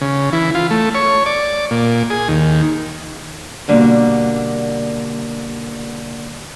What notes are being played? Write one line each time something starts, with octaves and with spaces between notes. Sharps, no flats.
C#3
E3
F4
A3
C#5
D5
A#2
G#4
D#2
B2 D3 G3 A#3